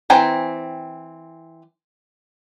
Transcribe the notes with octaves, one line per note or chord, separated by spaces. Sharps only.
E3 C4 G5 G#5 A#5